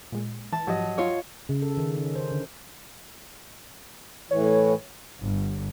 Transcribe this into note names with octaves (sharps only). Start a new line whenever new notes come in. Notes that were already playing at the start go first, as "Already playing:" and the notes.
A#2 G#3
E3 A5
G#2 F3 F#3 G4 D#5
F4 C#5
C#3
A4
D#3
C#4
C5
D3
A2 E3 C#5
G1